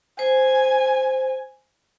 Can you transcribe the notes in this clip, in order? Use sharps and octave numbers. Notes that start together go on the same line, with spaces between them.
C5 G#5